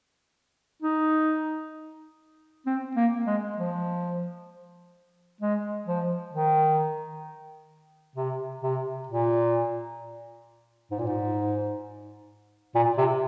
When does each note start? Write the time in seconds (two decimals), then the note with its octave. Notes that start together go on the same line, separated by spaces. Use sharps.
0.82 D#4
2.66 C4
2.96 A#3
3.27 G#3
3.58 F3
5.41 G#3
5.87 F3
6.33 D#3
8.16 C3
8.62 C3
9.07 A#2
10.91 G#2
10.99 A#2
11.07 G#2
12.75 A#2
12.98 C3